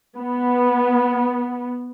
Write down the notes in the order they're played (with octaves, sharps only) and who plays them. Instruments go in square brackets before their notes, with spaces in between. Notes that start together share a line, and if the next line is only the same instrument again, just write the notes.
[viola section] B3